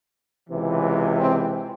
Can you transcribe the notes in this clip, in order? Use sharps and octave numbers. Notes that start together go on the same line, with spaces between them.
C#2 C3 E3
C4